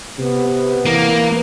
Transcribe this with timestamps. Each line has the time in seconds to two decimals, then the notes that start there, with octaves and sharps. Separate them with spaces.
0.19 C3 B3
0.86 E3 A#3